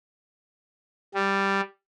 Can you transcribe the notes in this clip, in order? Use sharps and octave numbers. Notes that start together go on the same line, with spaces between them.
G3